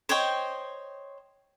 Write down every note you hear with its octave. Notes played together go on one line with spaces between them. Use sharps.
C5 C#5 D#5 G5